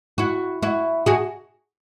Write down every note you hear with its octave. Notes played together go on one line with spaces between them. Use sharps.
E4 F#4
E4 F#4
F#4 G#4